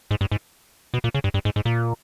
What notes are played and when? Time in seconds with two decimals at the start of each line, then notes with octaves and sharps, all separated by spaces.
0.11 G#2
0.21 G2
0.32 G#2
0.94 B2
1.04 A#2
1.15 C#3
1.24 G2
1.34 G2
1.45 G#2
1.56 G#2
1.65 A#2